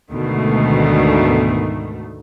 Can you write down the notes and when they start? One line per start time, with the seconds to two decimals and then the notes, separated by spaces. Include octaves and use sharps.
0.11 D2 G#2 B2 D#3 A3